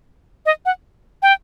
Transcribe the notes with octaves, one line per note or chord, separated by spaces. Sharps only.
D#5
F#5
G5